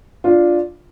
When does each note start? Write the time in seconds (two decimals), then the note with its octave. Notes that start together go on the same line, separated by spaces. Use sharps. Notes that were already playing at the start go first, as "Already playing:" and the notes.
0.24 D4 F4